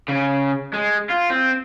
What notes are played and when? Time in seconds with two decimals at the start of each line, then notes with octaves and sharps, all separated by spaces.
0.09 C#3
0.73 G#3
1.09 F4
1.30 C4